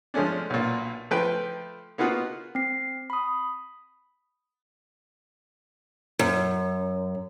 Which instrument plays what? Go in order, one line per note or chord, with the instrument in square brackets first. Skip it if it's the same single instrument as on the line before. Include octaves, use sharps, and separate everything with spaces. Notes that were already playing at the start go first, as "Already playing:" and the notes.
[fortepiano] F3 G#3 A3 C#4 D4
B1 A#2
F3 A3 B4 G5
A#3 B3 D#4 F4 F#4
[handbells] C4 C7
B5 D#6
[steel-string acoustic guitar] F#2